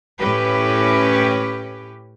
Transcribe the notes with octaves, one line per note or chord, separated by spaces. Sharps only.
A2 C#4 G4 B4